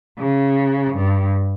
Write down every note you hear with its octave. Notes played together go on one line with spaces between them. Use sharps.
C#3
G2